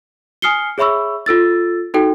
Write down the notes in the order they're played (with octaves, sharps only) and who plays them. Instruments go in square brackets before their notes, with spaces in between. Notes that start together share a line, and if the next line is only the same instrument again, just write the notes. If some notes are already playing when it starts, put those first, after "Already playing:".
[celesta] G#5 D#6 F6 C7 C#7 G7
G#4 C#5 E5 B5 C#6 E6
F4 A4 E6 A6
D#4 F#4 A4 G5